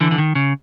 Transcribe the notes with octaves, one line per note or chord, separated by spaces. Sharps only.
D3 E3
D3
D#3
C#3